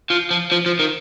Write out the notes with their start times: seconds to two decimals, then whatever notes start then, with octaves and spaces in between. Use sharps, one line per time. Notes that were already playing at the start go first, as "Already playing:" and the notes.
0.10 F3
0.31 F3
0.52 F3
0.66 F3
0.79 D#3